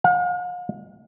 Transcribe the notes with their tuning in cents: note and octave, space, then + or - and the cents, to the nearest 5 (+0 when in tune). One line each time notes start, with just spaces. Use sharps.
F5 +45